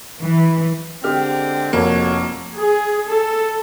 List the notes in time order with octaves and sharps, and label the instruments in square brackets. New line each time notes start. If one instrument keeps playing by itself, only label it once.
[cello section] E3
[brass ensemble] D3 G#3 C4 [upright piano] G4 F6
[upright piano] F1 F2 [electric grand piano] A#3 [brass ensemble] F#4 C#5
[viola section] G#4
A4